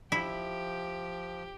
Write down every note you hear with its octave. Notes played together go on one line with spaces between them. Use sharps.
F3 E4 G4